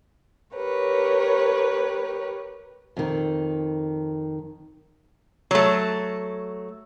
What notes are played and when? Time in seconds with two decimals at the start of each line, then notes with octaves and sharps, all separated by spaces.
0.56 G4 A#4 B4 C#5
2.97 F2 D#3
5.51 F#3 A3